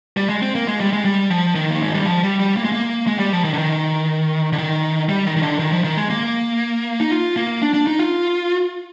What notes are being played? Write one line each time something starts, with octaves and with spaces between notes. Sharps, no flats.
G3
G#3
C4
A#3
G#3
G3
G#3
G3
F3
D#3
A#3
G#3
G3
F3
G3
G3
A#3
G#3
A#3
G#3
G3
F3
D#3
D3
D#3
D3
D#3
G3
D#3
D#3
D3
D#3
F3
D#3
G#3
A#3
D#4
F4
A#3
D4
D4
D#4
F4